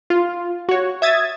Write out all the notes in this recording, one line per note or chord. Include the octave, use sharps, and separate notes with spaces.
F4
F#4 C#5
E5 D#6 G#6 A6